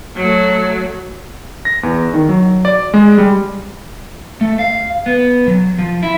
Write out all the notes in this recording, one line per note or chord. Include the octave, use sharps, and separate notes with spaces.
F#3 A3
A#6
E2
D#3
F#3
D5
G#3
G3
A3
F5
B3
F#3
F3
E4